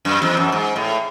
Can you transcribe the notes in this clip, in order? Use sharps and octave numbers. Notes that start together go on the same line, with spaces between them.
F#2
E2
F#2
G#2
A2